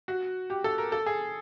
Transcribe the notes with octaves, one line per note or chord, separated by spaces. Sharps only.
F#4
G4
A4
A#4
A4
G#4